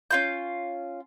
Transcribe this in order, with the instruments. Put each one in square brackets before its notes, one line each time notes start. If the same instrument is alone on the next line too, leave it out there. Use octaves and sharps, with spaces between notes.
[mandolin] C#4 F4 G6